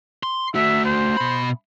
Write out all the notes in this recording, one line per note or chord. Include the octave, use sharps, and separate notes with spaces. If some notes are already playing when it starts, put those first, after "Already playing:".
C6
A3 F#4 E5
C5
B2 B5